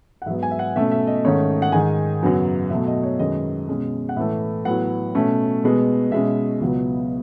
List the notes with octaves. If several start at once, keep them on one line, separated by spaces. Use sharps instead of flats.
F#5
G#2 F#3 B3 E5
G#5
E5
F#5
B2 A3 C#4 E5
E5
D#5
G#2 D#3 A3 C#4 C#5
F#5
G#2 D#3 G#3 G#5
F#2 C#3 F#3 B3
B2 F#3 A3 E5
D#5
C#5
F#2 D#3 G#3 B3 D#5
B2 G#3 C#4
F#5
A2 E3 A3 E5
A2 F#3 B3 F#5
B2 A3 C#4
B2 G#3 B3
B2 G#3 C#4 E5
C#2 B2 F#3 B3